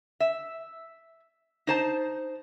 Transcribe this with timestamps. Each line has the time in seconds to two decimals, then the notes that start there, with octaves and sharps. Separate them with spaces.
0.20 E5
1.67 D#4 C5 A5